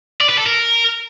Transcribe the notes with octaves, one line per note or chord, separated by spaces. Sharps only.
D5
B4
A4
A#4